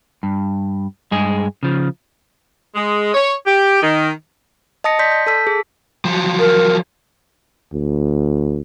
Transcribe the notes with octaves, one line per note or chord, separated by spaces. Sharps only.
G2
G2 G#3 G#4
C#3 F3
G#3
C#5
G4
D#3
D#5 A5 D#6 A#6 C#7
D5 C6 G6 B6
G6
A4 A5 E6 B6
G#4
F3 F#3
A#4
D2